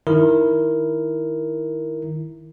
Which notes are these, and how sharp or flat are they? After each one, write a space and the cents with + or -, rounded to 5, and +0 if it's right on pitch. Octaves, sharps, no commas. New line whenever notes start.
D#3 +0 E4 +0 A#4 +0